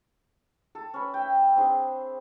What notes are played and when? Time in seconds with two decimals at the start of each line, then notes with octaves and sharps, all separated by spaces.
0.75 A4
0.94 C#4 B4
1.14 E5 G5
1.56 C4 D4 G#4